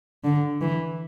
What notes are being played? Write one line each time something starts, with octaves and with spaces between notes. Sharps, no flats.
D3
E3